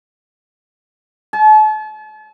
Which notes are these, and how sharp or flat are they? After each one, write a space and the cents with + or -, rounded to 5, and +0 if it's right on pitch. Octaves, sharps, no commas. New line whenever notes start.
A5 -40